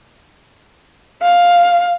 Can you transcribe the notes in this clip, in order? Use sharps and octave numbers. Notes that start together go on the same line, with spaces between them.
F5